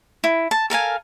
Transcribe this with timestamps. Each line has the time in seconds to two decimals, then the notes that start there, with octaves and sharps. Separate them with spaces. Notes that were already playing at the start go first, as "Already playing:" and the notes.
0.24 E4
0.51 A5
0.70 A4 A#4 F5 G#5